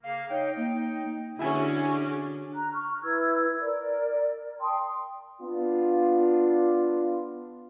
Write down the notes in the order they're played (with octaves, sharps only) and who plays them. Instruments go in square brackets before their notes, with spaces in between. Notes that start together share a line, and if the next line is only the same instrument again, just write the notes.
[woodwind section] C#3 A#3 [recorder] F5
[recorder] D#4 [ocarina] C#5 [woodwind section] G5
[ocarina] A#3 [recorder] D#4
[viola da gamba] D3 D4 [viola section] C#4 F#4 G#4 [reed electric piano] E4 E5 G#5
[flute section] A#5 F#6
C#6 F6
E4 B4 E6 G#6
A#4 D5
G5 A5 C6 D#6
[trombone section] B3 D4 F4